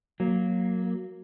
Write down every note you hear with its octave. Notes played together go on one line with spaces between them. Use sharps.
F#3 A#3